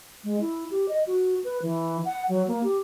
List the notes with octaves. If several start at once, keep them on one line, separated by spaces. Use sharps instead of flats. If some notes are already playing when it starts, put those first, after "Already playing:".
G#3
E4
G4
D#5
F#4
B4
E3
F#5
F#3
A#3
G4